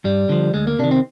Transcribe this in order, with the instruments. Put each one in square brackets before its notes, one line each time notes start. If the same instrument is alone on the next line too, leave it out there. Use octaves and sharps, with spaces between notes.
[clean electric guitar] G2 G3
D3 F3
D2 G#3
A#3
C3 D#3 D4
C4